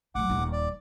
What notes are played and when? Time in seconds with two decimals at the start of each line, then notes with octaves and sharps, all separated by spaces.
0.15 A1 F#3 F#5 D6
0.29 D#1 D#2
0.53 D5